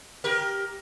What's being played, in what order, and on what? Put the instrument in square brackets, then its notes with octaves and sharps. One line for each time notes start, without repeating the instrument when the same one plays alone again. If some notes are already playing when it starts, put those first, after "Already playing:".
[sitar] G4 A#4